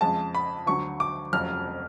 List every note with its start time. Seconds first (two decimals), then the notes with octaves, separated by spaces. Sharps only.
0.01 F2 C#3 G#3 A5
0.35 B5
0.67 D2 D3 F#3 C#6
1.00 D6
1.33 F1 F2 C#3 F#3 F6